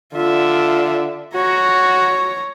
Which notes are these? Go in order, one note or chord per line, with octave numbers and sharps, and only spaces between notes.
D3 F4 E5
F#4 C#5 A#5